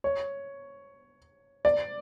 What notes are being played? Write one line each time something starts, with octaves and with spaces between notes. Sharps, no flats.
C#5
D5